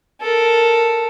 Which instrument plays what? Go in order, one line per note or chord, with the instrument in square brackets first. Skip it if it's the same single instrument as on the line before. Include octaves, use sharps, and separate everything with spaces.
[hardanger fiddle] A4 A#4